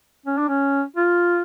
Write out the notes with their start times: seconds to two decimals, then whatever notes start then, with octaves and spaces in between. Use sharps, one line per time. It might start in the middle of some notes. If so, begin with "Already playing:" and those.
0.26 C#4
0.38 D4
0.49 C#4
0.96 F4